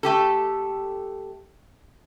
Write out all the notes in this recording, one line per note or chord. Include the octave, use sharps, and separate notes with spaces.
A3 G4 A4